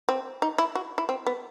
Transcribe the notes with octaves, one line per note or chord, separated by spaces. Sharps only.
C4
D#4
E4
F#4
E4
C4
B3